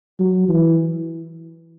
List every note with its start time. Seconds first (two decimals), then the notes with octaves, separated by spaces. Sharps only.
0.19 F#3
0.49 E3